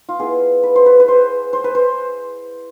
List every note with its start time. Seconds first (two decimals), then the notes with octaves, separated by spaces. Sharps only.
0.09 F4
0.19 B3 E4 G#4
0.63 B4
0.75 C5
0.86 B4
1.00 B4
1.08 C5
1.53 C5
1.64 B4
1.75 C5